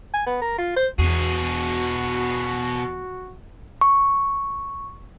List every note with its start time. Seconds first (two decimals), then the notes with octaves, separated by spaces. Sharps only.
0.14 G#5
0.27 B3
0.41 A#4
0.58 F4
0.76 C5
0.99 E2 B2 F#4 G#4
3.81 C#6